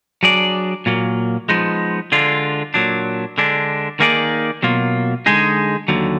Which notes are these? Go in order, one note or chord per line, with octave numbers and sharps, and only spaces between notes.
F#3 D4 G#4 D5
A#2 F#3 A#3
F3 G#3 B3 D#4
D3 G#3 D4 F4
A#2 F#3 D4
D3 G#3 D4
D#3 A#3 D#4 G#4 D5
B2 F#3 A#3 F4
D3 G#3 D#4 G#4
D#2 D3 F#3